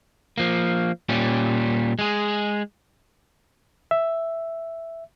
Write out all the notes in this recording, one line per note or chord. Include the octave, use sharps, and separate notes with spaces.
F3 A#3
A#2 G3 C#4
G#3 G#4
E5